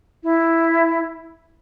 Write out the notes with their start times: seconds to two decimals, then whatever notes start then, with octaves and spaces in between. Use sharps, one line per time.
0.23 E4